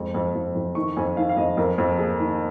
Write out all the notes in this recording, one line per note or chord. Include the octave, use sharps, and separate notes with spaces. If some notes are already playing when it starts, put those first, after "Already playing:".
Already playing: F2 G#3
F2
F2
F2
D#3 C#6
F2 G#5
D#3 F5
F5
F2 D#5
F2 A#4
F2
A#3 G#4
D#3